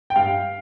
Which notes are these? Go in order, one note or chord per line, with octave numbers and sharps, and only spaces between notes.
G5
G2 F5